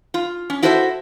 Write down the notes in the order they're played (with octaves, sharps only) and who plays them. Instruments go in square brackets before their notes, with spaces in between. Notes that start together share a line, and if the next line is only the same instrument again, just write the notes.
[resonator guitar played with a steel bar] F4
C#4
E4 F#4 A4 C5 D#5 E5